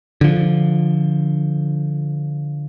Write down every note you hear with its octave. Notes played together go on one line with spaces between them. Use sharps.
D3 F3